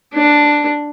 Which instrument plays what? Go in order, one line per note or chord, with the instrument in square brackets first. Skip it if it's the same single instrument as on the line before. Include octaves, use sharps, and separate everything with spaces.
[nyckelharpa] D4